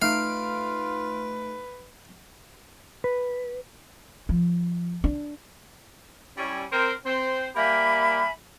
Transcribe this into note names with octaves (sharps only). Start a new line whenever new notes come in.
A3 D#4 F4 B4 F5 D7
B4
F3
D4
G3 C#4 E4
C4 A#4 C5
C4 C5
G3 A#3 G4 E5 G#5 B5